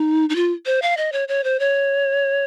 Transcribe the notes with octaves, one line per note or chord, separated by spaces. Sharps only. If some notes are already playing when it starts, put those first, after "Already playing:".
Already playing: D#4
D#4
F4
C5
F5
D#5
C#5
C#5
C5
C#5